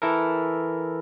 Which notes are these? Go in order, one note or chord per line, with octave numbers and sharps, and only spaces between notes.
E3 E4 A4 A#4